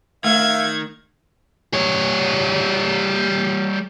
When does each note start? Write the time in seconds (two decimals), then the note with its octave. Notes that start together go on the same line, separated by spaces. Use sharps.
0.24 D#3 A3 E5 F5 G#6
1.74 G3 C#5